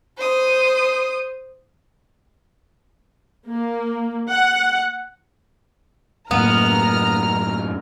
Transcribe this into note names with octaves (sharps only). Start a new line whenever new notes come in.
C5 D#6
A#3
F#5
F#2 A2 A#3 B3 A#5 F6